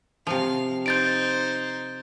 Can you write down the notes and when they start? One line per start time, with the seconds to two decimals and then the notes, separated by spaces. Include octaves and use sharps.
0.27 C3 F3 F5
0.86 D#4 C5 G6 A6 D7